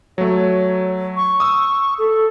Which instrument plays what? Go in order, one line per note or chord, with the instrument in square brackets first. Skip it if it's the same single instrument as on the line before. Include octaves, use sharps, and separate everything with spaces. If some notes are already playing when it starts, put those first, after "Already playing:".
[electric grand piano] F#3 A3 [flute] C#5
[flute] C#6
[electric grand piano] D#6 E6
[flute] A4